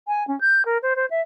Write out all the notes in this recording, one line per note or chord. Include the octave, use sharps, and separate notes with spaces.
G#5
C#4
G6
A#4
C5
C5
E5